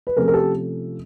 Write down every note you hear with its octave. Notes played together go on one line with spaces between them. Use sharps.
B4
C3 F3 A3 C#4 G#4 A#4
A#4
G4 A4